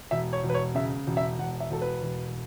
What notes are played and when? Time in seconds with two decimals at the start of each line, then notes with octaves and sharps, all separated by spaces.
0.11 E1 E5
0.33 C#5
0.43 E1
0.50 B4
0.54 C#5
0.75 C#3 E5
1.07 E1
1.17 E5
1.39 E1 F#5
1.60 E5
1.71 E1 A4
1.82 B4
2.02 E1